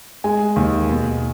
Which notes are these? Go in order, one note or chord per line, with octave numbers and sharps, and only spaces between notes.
G#3 G#5
D#2
B2